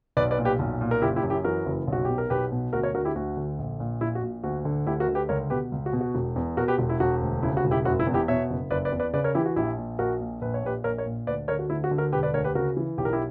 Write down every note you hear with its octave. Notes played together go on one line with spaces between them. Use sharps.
B1 B4 D5
B4 D5
A#2
G4 B4
B1
A#2
A#4
F#1 E4 G4
E4 G4
F#2
E4 G4
E3 F#4 A#4
F#1
B1 F#4
B2 G4
A#4
B1 G4 B4
B2
D2 F#4 A#4
A#4 C#5
D3 F#4 A#4
E4 G4
D2 F#4
D3
A#1
A#2
A#1 E4
F#4
A#2
D2 F#4
D3
D2 E4 G4
F#4 A#4
D3
G4 B4
C#2 A#4 C#5
B2 G4 B4
C#2
F#4
B2
F#4
E1
E2
B2 F#4 A#4
G4 B4
E1
E4
E1 F#4
D2
C#3 E4
F#4
E1
E4 G4
F#1 F#4
E4
E2
E4 G4
B2 C#5 E5
F#1
F#1 B4 D5
B4 D5
E2
B4 D5
C#3 B4 D5
A#4 C#5
E3 E4 G4
F#4
A#1 E4 G4
A#2
A#1 F#4 A#4
A#2
A#1 B4
C#5
A#2 G4 B4
A#1 A#4 C#5
A#4 C#5
A#2
D2 B4 D5
D3 A#4 C#5
F#4
D2 E4
F#4
D3
F#4 A#4
E1 G4 B4
B4 D5
D2 A#4 C#5
G4 B4
C#3 F#4 A#4
E3
B1 G4
A#4
E4 G4